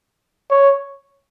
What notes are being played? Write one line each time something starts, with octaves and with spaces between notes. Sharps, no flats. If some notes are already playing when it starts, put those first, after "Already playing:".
C#5